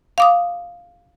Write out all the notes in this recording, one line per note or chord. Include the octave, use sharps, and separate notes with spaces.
F5 D6 D#6